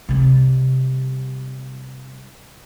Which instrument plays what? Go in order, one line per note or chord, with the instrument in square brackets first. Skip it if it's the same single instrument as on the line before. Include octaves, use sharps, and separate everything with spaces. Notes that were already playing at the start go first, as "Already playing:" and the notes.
[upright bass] C3 G3